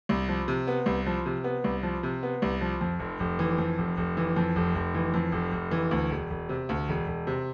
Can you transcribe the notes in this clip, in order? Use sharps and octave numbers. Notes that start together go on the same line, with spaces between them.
C2
F3
C3
B3
C2
F3
C3
B3
C2
F3
C3
B3
C2
F3
F2
F1
F1
E3
F2
F1
F1
E3
F2
F1
F1
E3
F2
F1
F1
E3
D2
E1
E1
C3
D2
E1
E1
C3